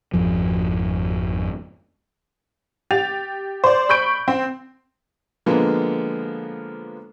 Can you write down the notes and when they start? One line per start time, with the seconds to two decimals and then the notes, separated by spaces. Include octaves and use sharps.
0.14 G#1 F2 F3
2.91 G4 A6 F7
3.64 C5 D5
3.89 B5 C#6 G6 D7
4.28 C4
5.46 D3 F3 G#3 A#3 B3